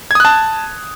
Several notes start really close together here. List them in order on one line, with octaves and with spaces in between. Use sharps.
G#6 D#6 F#6 A5